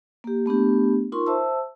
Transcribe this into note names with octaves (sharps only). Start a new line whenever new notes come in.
A#3 G4
A3 B3 D4 G4
D#4 F4 A#4 C6 C#6
C5 E5 A5 E6